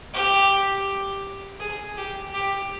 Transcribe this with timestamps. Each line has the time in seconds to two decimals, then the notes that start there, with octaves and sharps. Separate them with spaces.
0.14 G4
1.60 G#4
1.97 G4
2.33 G4